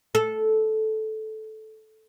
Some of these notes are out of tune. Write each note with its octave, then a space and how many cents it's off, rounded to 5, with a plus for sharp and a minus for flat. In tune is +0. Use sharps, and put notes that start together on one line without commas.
A4 -10